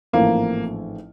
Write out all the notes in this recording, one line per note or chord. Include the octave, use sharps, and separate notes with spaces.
A1 G#2 F3 A3 A#3 C4